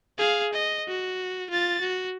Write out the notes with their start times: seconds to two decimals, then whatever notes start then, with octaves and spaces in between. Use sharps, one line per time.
0.18 G#4 F5
0.53 D#5
0.88 F#4
1.50 F4 A6
1.81 F#4